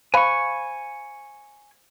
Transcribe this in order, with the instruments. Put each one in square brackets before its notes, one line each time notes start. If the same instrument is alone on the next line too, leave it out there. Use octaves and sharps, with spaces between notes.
[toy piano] C5 F5 B5 [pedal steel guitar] G#5 C#6